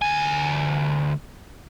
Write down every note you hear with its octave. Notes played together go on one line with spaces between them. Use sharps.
D2 G#5